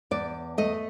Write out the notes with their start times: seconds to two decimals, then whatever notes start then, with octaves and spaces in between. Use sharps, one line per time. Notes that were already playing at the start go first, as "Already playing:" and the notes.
0.11 E2 D5
0.58 A3 D#5